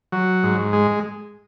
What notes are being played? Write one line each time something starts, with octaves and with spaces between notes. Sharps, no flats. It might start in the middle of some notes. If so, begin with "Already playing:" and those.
F#3
G#2
G#3